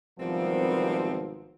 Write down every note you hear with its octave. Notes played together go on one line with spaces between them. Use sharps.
G#1 C3 E3 F3 G3 B3 C4 A#4